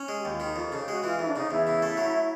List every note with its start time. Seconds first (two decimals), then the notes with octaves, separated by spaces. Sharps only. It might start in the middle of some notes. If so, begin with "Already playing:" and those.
Already playing: C#4
0.08 G#3
0.21 D#2 G4
0.33 F4
0.40 D#3 D#4
0.56 F2 F4
0.68 C#3 A4
0.80 G4
0.88 G#3 F#4
1.03 E3 F4
1.19 F2 E4
1.28 D4
1.35 C#3 D#4
1.51 E2 E4
1.67 C#3
1.82 A3
1.97 F#3